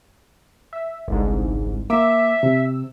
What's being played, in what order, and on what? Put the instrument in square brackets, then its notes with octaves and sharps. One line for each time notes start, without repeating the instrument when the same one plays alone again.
[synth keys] E5
G1 C2 G#2
[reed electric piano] A#3 D6 [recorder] E5 [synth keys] E6
[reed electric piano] C3